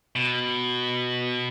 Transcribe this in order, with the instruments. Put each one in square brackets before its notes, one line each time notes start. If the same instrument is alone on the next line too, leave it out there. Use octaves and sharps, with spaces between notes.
[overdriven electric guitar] B2